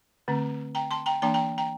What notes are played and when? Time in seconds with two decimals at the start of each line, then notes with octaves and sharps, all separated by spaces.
0.28 D3 A3 C4
0.75 G5 A#5
0.91 A5 C6
1.06 G5 A#5
1.22 E3 A#3 D4 G5 A#5
1.34 G5 A#5
1.58 G5 A#5